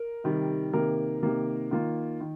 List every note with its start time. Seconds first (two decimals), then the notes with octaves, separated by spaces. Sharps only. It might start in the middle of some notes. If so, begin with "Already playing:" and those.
Already playing: A#4
0.24 C3 D#3 G3
0.73 C3 D#3 A#3 A#4
1.23 C3 D#3 A#3
1.71 D#3 A#3 F4
2.21 D#3